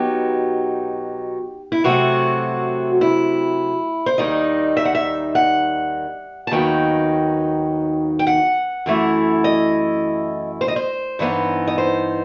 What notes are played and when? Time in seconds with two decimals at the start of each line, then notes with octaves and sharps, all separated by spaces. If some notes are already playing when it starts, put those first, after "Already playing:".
Already playing: B2 F#3 B3 D#4 G4
1.72 E4
1.84 C3 F#3 A3 C4 F#4
3.01 E4
4.06 C5
4.18 D#2 D#3 G3 D#4 D#5
4.77 E5
4.85 F#5
4.95 E5
5.35 F#5
6.47 A5
6.51 D#2 D#3 F#3 B3 D#4 G5
8.19 G5
8.27 F#5
8.86 F#2 E3 A3 E4
9.44 D#5
10.61 C5
10.68 D#5
10.76 C5
11.19 G2 E3 B3 D#4
11.67 D#5
11.78 C5